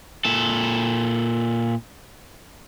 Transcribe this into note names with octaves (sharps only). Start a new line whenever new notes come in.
A#2 A4